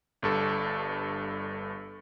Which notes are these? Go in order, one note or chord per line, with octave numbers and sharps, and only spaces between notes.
G1 G2 A4